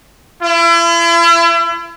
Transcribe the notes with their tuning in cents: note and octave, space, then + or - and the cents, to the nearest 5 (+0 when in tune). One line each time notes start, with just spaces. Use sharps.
E4 +40